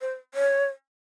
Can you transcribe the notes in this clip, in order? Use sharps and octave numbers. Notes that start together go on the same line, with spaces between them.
C5
C#5